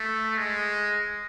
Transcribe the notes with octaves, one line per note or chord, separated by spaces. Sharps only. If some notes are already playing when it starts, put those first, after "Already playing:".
Already playing: A3
G#3